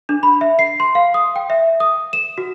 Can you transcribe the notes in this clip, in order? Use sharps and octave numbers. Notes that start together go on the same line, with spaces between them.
D4
B5
E5
C7
C6
F5
D#6
G5
E5
D#6
E7
F#4